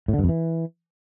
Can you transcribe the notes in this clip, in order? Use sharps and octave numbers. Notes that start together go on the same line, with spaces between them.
A2
D3
G2
F2
E3